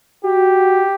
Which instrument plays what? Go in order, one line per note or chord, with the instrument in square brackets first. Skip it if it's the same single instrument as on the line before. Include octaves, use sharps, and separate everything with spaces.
[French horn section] F#4 [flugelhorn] G4